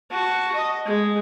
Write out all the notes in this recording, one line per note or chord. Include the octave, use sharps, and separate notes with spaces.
F#4 A5
D#5
G#3